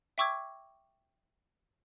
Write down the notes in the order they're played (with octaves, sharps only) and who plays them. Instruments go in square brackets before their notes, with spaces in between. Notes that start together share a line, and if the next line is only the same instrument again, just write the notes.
[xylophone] E5 G5 C#6 D6 E6 G#6